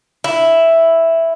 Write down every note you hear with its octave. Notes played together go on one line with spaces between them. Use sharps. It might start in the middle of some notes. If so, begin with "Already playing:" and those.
E4